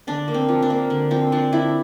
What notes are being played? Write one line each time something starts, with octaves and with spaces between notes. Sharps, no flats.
D3 D4
A#3
C4
F3
D4
A#3
D3
F3 C4
F3 D4
D3 E4